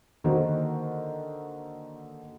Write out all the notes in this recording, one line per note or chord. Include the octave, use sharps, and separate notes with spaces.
D3 D#3 A#3 F#4 C5